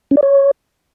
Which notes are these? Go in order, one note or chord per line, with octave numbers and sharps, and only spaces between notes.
C#4
D5
C#5